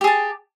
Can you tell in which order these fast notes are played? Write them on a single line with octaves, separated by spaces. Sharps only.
G4 G#4 A5